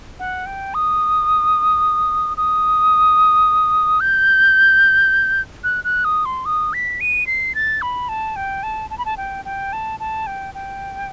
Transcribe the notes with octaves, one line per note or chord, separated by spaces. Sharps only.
F#5
G5
D#6
D#6
G6
F#6
F#6
D#6
C6
D#6
B6
D#7
C7
A6
B5
A5
G5
A5
A5
B5
A5
G5
G5
A5
A5
G5
G5